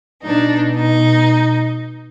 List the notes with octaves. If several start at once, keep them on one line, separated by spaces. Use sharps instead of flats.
B2 D4 D#4
D#4